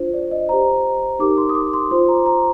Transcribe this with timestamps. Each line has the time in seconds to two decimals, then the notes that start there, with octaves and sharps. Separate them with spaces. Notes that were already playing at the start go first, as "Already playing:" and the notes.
Already playing: D4 F4 C5
0.14 D5
0.31 D#5
0.49 G4 C5 A#5
1.19 D#4 G4 A#4 D6
1.38 C6
1.49 D#6
1.55 D6
1.73 C6
1.91 F4 C5 C6
2.08 A#5
2.26 A#5